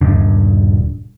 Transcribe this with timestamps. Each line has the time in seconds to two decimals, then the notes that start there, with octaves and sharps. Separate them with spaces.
0.01 D#1 G2 D3